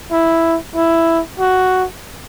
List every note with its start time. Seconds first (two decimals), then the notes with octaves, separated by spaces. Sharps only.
0.12 E4
0.76 E4
1.40 F#4